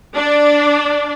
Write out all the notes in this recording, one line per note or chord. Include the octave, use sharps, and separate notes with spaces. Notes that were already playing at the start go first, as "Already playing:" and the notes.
D4 D5